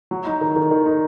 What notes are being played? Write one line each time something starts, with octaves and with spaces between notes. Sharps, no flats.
F#3
D#4
D#3
D#3
D#3
D#4